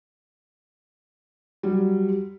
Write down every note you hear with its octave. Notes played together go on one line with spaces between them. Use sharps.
F#3 G3